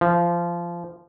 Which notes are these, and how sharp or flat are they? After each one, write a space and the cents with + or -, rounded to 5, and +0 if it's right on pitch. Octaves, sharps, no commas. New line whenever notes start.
F3 -20